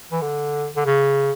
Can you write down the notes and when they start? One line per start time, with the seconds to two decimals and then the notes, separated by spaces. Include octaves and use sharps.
0.12 E3
0.21 D3
0.76 D3
0.86 C#3